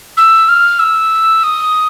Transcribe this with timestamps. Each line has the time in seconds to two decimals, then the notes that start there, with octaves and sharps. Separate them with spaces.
0.17 E6
0.49 F6
0.79 E6
1.43 D#6